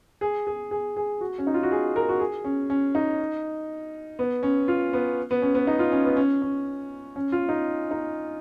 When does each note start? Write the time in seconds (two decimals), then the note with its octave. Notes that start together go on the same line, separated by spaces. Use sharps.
0.21 G#4
0.47 G#4
0.71 G#4
0.96 G#4
1.21 F#4
1.38 C#4
1.47 D#4
1.54 F4
1.63 F#4
1.71 G#4
1.96 A#4
2.09 F#4
2.20 G#4
2.44 C#4
2.70 C#4
2.95 D#4
4.19 B3
4.43 C#4
4.68 F4
4.93 B3
5.31 B3
5.42 C#4
5.55 B3
5.67 D#4
5.79 F4
5.92 C#4
6.05 B3
6.17 C#4
6.42 C#4
7.16 C#4
7.32 F4
7.49 D#4
7.91 D#4